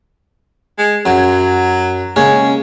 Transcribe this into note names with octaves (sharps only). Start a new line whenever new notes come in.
G#3
F#2 F#3
C#3 G#3 A#3 C#4